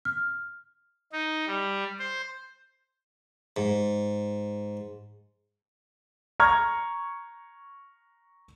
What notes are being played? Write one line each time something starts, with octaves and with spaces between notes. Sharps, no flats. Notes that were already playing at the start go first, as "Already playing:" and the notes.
F6
D#4
G3
C5
G#2
A#5 C#6 F6 G#6